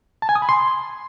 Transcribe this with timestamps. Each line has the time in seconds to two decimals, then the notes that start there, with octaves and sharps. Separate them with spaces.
0.22 A5
0.29 G#5
0.35 D#6
0.42 B5
0.49 C6